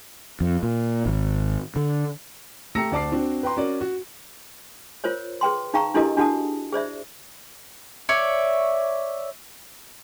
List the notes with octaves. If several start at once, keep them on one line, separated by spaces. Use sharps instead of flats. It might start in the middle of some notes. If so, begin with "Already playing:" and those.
F2
A#2
G#1
D3
A3 G4 A#5 E6 A#6 C#7
D2 D5 A5 D6 C7
C4 D4 F#4
B4 G5 A#5 C6
C#4 F#4 A#4 D5
F#4
F4 A#4 C5 C#5
G#4 B4 G5 C6
D#4 G#4 F5 G5 A#5 C#6
D4 E4 G4 A4 A#4 D#5
D4 F#4 G#4 F#5 A5 D#6
G#4 C5 D5 E5
C#5 D5 E5